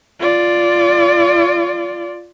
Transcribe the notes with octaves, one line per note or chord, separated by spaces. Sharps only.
F4 D5